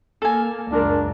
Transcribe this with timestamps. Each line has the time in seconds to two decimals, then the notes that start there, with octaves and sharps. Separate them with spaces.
0.22 A#3 A4 G#5
0.72 C#2 F#2 D4 F4 A#4